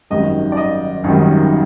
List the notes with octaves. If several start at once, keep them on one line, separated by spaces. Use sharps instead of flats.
G#1 F#2 D#3 G3 D#5
D5
D#5
G#1 F#2 D#3 G3